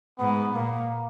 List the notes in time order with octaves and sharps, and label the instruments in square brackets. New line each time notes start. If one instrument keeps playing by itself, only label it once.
[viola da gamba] G#2 [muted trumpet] B3
[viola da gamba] A#2 [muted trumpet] A#3